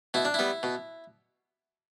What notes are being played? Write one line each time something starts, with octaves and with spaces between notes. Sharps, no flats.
B2 E4
D4
G3 B3 E4
B2